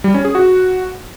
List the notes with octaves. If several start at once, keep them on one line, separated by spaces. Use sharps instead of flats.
G3
C#4
G#4
F#4